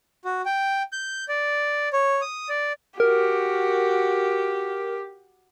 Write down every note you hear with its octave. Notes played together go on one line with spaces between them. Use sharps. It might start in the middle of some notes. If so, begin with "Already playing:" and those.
F#4
G5
G6
D5
C#5
D#6
D5
F#4 G4 A#4